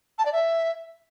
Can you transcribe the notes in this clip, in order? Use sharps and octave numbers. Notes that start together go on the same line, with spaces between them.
A5
D5
E5